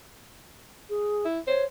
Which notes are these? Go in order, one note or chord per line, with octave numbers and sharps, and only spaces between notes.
G#4
E4
C5 C#5